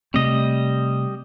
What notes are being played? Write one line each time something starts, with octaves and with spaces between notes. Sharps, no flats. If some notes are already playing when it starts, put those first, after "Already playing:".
C3 G3 A3 C4 D#5